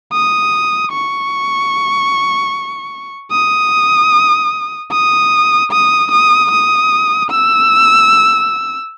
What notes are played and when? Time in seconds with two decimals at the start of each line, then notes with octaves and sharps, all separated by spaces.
0.13 D#6
0.92 C#6
3.32 D#6
4.92 D#6
5.72 D#6
6.12 D#6
6.51 D#6
7.31 E6